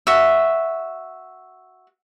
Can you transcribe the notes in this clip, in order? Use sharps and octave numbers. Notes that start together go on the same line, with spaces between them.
F#4 E5